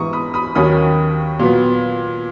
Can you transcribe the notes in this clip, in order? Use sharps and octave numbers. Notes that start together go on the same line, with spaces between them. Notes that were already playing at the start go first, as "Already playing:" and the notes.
Already playing: G#2 E3 B3 A#5 C#6 D#6
B5 D#6
B5 D#6
D#2 D#3 F#3 A#3 C#4 B5 D#6
A#2 F#3 B3